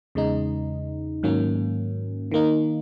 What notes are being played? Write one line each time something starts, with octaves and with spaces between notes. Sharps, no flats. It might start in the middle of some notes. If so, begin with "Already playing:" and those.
E2 C#3 G#3 D#4
G#2 D#3 F#3 A#3 C#4
D#3 A#3 D#4